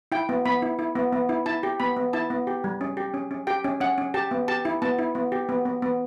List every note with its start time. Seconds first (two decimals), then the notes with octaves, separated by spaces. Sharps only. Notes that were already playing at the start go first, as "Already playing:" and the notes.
0.12 E4 G5
0.29 B3
0.45 B3 B5
0.62 E4
0.79 E4
0.96 B3
1.13 B3
1.29 E4
1.46 E4 A5
1.63 G4
1.80 B3 B5
1.97 B3
2.13 E4 A5
2.30 B3
2.47 G4
2.64 G3
2.81 C#4
2.97 G4
3.14 C#4
3.31 C#4
3.47 G4 G5
3.64 C#4
3.80 C#4 F#5
3.98 C#4
4.14 G4 A5
4.31 B3
4.48 G4 A5
4.65 E4
4.82 B3 A5
4.99 E4
5.15 B3
5.32 G4
5.49 B3
5.65 B3
5.82 B3